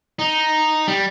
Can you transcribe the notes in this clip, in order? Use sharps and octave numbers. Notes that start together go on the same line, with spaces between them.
D#4
G3